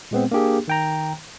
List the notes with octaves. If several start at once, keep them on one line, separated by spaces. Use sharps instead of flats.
A#2 G#3 B3 C4
A#3 D4 G4 G#4
D#3 G5 A#5